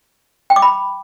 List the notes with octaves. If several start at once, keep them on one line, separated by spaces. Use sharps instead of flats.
G5
D6
B5